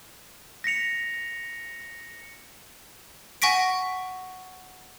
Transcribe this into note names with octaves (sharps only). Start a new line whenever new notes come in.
A#6 B6 C#7 F7
F#5 G#5 C#6 A#6 B6 D7